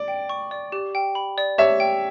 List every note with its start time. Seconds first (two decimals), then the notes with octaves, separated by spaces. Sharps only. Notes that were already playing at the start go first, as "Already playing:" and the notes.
Already playing: D5
0.08 G5
0.29 C#6
0.51 D5
0.72 G4
0.95 G5
1.15 B5
1.38 D5
1.58 G4 C#5 E5
1.80 G5